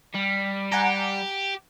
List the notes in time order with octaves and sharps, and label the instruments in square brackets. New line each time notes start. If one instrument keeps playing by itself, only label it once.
[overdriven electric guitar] G3
[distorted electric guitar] G4 [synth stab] F#5 G#5 A#5